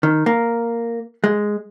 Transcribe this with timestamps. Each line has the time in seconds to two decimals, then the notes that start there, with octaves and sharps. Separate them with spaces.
0.03 D#3
0.26 A#3
1.24 G#3